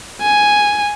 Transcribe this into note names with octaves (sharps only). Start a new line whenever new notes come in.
G#5